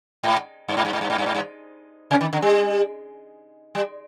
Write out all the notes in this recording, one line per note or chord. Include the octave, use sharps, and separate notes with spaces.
G#2
G2
G#2
G2
G#2
G2
G#2
G2
G#2
G2
C3
D#3
D3
G3
G3